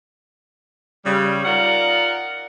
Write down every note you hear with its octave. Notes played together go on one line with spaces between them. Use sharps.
C#3 G3
D#4 F4 A#4 D5 F#5